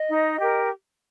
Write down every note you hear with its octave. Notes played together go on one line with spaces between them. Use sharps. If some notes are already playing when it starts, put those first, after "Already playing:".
Already playing: D#5
D#4
G4 A#4